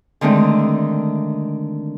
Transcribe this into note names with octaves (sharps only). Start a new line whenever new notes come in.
D3 D#3 G#3 A3 C4